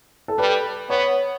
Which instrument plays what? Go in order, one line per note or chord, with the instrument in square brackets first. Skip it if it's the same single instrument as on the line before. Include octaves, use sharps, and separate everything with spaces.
[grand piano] A4
[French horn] G3 [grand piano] B4
[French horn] B3 [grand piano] C#5